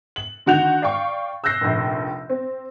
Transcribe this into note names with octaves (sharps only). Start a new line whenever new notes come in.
F#7
D3 D#3 F#4 F#5 G6 F7
D5 F5 G5 C#6
E6 F#6 G6 A#6 C7
F1 A#1
C4